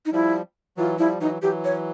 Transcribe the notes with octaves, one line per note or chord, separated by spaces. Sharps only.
D#4
F3 G3 E4
E3 F#3 F4
F3 G3 E4
E3 F#3 D#4
E3 F#3 G4
C#5